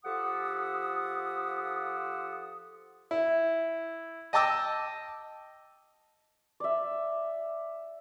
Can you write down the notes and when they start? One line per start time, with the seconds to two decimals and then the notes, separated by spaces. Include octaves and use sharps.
0.04 F3 G4 A4 F#5 D#6
3.11 E4
4.33 D#5 G5 A5 D6 E6
6.60 D5 E5